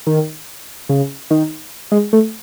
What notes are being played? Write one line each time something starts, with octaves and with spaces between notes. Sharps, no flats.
D#3
C#3
D#3
G#3
A3